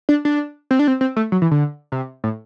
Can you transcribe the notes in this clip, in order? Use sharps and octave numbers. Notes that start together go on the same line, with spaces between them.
D4
D4
C4
D4
C4
C4
A3
F#3
E3
D3
C3
A2